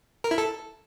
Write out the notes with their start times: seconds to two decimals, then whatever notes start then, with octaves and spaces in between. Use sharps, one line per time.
0.24 A#4
0.31 E4
0.38 A4